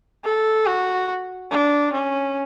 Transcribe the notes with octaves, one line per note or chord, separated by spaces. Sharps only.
A4
F#4
D4
C#4